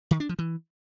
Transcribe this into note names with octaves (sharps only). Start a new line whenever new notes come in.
D#3
D4
F3
E3